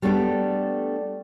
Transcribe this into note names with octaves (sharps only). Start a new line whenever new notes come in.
G3 A3 B3 D4 A4